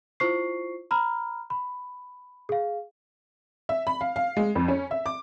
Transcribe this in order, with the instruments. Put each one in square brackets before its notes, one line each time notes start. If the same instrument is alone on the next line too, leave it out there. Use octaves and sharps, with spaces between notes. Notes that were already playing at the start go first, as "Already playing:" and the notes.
[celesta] E4 F4 C5 C#6 C7
A#5 B5 F6
B5
G#4 F5
[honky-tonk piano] E5
B5
F5
F5
G#3
F2
C#4
E5
D6